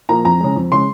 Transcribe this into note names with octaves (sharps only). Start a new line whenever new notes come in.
A#2 F3 A#3 A#5
F2 A#5
C#3 G#3
F2
C#3 G#3 C6